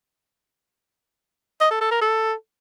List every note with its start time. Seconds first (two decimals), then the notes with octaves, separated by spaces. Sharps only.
1.61 D#5
1.71 A4
1.81 A4
1.91 A#4
2.01 A4